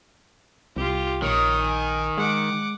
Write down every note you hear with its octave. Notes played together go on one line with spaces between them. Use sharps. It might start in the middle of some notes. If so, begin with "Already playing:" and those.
C2 F4 G4
A#1 D#3 C#5 D#6
G#5
G#3 F#5 D6